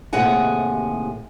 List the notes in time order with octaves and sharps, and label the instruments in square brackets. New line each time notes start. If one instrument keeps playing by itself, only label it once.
[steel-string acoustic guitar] D#2 A2 C3 G#4 F#5 G#5